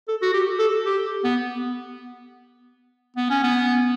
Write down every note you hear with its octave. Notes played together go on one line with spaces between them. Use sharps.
A4
F#4
G4
A4
G4
B3
B3
C#4
B3